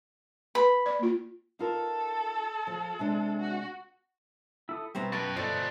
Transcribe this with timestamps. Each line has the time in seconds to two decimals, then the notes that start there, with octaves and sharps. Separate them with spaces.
0.55 B4 B5
0.86 D5
0.99 A#3 F4
1.59 D#4 F4 A4 A#4
2.67 F3
2.99 C3 G#3 D4
3.40 F#4
4.69 E4 A4 D#6
4.95 B2 G3 C4 E4 B4 A#5
5.13 F#2 B4 F#5 G5 A5 B5 C#6
5.36 G1 F4 A4 C5 D5 D#5 F#6